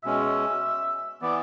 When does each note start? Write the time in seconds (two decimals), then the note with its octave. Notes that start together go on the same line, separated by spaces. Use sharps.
0.04 B2 G#3 C#4 E5
1.21 E3 B3 D5